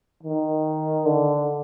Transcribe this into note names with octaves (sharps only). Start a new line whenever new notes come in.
D#3
D3